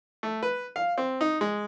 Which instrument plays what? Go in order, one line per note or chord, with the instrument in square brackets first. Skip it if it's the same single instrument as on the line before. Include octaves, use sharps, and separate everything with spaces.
[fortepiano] A3
B4
F5
C4
D#4
G#3